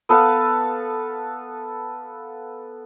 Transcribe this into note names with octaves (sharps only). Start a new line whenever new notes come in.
B3 A4 B4 F5